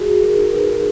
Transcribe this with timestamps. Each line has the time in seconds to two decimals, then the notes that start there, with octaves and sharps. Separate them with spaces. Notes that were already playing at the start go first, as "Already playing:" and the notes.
Already playing: F#4 G#4
0.22 A#4
0.37 D#4
0.53 B4